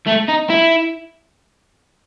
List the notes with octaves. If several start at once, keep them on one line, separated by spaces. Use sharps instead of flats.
A3
D#4
E4